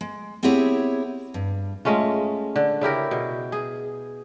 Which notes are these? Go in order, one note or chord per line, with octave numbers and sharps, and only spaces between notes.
G#3
B3 C4 E4 G4 G#4 C#5
G2
G#3 A3 C#4 F4
D3
C#3 E4 G4 A#4
B2
G#4